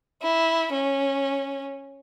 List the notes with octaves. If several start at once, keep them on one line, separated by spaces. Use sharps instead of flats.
E4
C#4